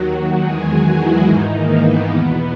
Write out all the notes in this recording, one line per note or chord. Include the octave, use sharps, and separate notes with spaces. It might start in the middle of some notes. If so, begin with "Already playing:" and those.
Already playing: D#2 D#3 F#3 F#4
E2 D#3 G#3 G#4
F#3 F#4
E3 E4
G#2 D#3 E3 D#4
A#3
B3
E2 B2 B3